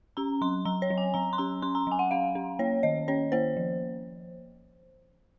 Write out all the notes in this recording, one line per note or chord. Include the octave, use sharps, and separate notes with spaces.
C#4 A#5
F#3 C6
F#3 A#5
C#5
F#3
G#5
F#3 A#5
C6
C#4 A#5
C#4 C6
A#5
F#3 G#5
F#5
C#4 F5
C#4
A#3 C#5
D#3 D#5
C#4 C#5
A#3 C5
F3